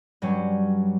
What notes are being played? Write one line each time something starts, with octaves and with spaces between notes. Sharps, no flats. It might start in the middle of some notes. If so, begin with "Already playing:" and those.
G2 F#3 G3 C#4